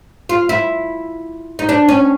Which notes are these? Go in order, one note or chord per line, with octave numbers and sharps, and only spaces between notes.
F4
E4
D#4
D4
C#4